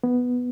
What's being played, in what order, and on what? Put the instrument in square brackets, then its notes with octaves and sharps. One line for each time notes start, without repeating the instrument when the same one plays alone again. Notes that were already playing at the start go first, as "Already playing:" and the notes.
[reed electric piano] B3